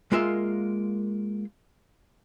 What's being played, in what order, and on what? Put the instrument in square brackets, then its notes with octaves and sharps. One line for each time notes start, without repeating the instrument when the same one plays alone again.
[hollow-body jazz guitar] G#3 A#3 F4 A#4 E5